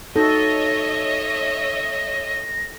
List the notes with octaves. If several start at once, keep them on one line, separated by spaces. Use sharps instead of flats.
D#4 F#4 A4 C#5 D#5 E5 A#6